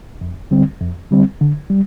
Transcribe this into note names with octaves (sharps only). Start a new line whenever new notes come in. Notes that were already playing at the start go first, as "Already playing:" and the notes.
F2
D3 G3 C4
F2
D3 G3 C4
D3
G3